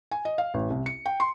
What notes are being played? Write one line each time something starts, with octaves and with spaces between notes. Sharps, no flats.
G#5
D#5
F5
A1
C2
C#7
G5
C6